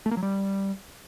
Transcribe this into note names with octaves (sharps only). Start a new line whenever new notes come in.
A3
A#3
F#3
G3